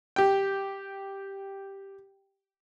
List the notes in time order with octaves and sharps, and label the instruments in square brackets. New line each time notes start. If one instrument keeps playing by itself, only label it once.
[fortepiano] G4 G5